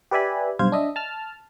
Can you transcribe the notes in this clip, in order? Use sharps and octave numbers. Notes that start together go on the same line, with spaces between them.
G4 B4 D5 E5 G#5 B5
B1 G2 C5 F5 G#6
D4 D#5 E5
A5 F6